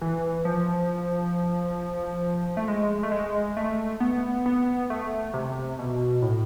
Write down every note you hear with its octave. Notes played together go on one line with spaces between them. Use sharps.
E3
F3
A3
G#3
A3
G#3
A3
B3
B3
A3
C3
B2
A2